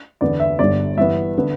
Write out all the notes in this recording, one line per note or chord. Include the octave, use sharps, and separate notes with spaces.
E2 D3 B3 D5
E5
G1 G2 D3 D5
G2 E3 B3 E5
D3 B3